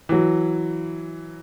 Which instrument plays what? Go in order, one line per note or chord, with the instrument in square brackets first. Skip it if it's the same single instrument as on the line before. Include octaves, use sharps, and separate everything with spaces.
[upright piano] E3 F#3